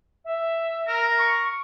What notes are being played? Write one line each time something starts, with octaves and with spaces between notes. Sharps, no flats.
E5
A#4
C#6